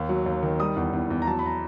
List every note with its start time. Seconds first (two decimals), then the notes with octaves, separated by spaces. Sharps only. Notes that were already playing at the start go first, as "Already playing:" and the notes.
Already playing: D#2
0.09 F#3
0.26 D#2
0.43 D#3
0.60 G3 D#6
0.76 E2
0.93 E2
1.10 E2
1.22 A#5
1.27 F#3 A5
1.39 B5
1.46 A#5